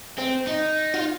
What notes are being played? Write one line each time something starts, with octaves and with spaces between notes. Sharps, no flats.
C4
D#4
F4